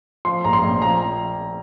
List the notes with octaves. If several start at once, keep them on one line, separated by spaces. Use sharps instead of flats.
F3 C6
A#1 A#5
C6
A#1
F3 A#5